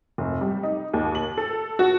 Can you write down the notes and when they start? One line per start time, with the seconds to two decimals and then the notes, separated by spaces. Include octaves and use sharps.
0.18 F1
0.41 G3
0.63 D#4
0.93 D#2
1.15 F#7
1.38 A4
1.79 F#4